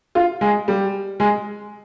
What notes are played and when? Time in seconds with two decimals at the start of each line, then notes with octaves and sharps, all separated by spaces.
0.15 F4
0.41 G#3
0.68 G3
1.20 G#3